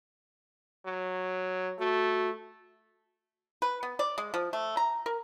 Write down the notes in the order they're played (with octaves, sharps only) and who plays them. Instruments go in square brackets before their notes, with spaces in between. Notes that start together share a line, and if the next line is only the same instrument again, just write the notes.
[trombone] F#3
[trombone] A3 [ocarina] F#4
[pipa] B4
B3
D5
G#3
F3
A3
A#5
A#4